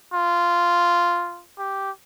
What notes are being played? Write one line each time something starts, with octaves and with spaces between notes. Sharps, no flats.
F4
G4